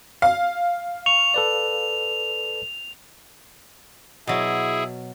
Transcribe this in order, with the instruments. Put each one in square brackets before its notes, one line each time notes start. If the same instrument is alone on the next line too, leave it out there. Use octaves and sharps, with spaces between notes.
[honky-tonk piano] F5
[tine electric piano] C#6 [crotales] F7
[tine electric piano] A4 B4 D5
[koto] B2 F#3 [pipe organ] E4 G#4